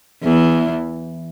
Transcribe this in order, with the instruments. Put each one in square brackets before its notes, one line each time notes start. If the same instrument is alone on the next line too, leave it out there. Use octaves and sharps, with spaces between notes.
[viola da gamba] E2 E3